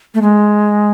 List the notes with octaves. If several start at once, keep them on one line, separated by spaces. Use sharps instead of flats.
A3
G#3